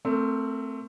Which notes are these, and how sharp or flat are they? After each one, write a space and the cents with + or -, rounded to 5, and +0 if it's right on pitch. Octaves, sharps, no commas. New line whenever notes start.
A3 +15 C4 +0 A#4 -10